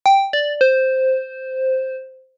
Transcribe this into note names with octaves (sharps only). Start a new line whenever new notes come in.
G5
D5
C5